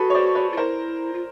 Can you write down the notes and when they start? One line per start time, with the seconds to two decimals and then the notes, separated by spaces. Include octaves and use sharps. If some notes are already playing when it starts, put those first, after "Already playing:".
Already playing: F#4 G#4 A4 B4
0.10 C#5
0.14 C5 D5
0.35 B4 C#5
0.52 F4
0.57 E4 A#4 C5
1.13 F4